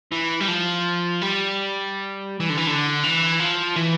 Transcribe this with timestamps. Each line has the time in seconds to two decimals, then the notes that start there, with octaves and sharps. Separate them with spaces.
0.12 E3
0.40 G3
0.48 F3
1.21 G3
2.40 E3
2.50 D3
2.58 E3
2.67 D3
3.04 E3
3.40 F3
3.76 E3